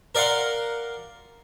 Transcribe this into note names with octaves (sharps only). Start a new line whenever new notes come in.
A#4 D5 F5 F#5 C6